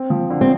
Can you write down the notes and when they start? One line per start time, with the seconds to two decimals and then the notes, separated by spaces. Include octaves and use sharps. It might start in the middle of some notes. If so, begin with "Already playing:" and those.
Already playing: C4
0.10 F3
0.30 D3
0.41 C4